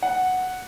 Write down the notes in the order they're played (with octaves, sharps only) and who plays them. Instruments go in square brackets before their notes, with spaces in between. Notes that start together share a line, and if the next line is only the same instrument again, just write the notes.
[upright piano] F#5